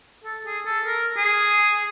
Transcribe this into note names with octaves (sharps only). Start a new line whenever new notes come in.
A4
G#4
A4
A#4
G#4